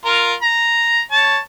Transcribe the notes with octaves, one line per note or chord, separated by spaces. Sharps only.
F4 A#4
A#5
C#5 A5